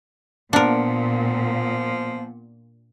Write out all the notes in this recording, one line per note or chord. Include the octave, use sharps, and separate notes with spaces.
A#2 F3 A#3 B3 D4 A#4 C#7